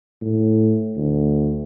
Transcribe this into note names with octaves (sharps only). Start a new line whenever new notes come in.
A2
D2